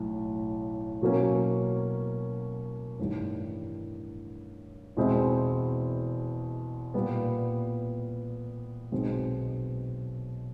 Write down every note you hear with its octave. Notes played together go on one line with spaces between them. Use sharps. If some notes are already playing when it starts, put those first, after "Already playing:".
Already playing: B1 A2
B2 F#3 A#3 C#4
A1 G2 D#3 G3
E2 B2 G#3 C4 E4
A#2 G3 B3
B1 B2 G#3 C4